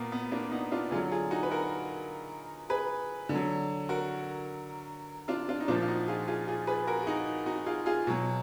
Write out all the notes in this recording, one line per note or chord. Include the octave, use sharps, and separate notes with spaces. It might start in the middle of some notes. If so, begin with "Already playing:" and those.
Already playing: A#2 A#3 B3
B3
A#3 D4
B3 D#4
D4 F4
D3 F#3 F4 G#4
F4 G#4
D#4 F#4
B4
F#4 A#4
G#4 B4
D3
F#3
F#4 A#4
D4 F4
D4 F4
D#4
A#2 F3 D4 F4
F4
D#4 F#4
F4 G#4
F4 G#4
F4 G#4
G#4 B4
F#4 A#4
G#4
D#4 F#4
D#4 F#4
F4 G#4
F4 G#4
B2 F#3